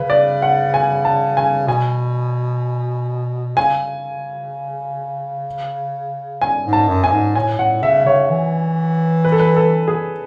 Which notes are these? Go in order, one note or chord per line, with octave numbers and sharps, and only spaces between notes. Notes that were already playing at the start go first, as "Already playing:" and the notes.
Already playing: C#3 B4
D5
F#5
G#5
A5
G#5
B2 G#5
C#3 G#5
G#5
G#2
A5
F#2
F#2 G#5
G#2
A2 G#5
A2 F#5
C#3 E5
C#3 C#5
E3
B4
A4
B4
A4
G#4